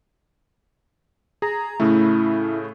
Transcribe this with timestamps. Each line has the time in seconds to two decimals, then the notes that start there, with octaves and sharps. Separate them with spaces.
1.42 G#4 A#5
1.80 A2 C#3 A3 E4